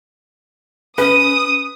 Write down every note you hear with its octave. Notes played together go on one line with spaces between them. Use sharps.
C#4 B4 D#6